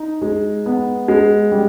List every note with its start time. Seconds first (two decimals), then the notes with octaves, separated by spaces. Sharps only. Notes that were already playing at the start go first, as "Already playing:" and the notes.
Already playing: D#4
0.22 G#3
0.66 B3
1.08 G#3
1.52 G3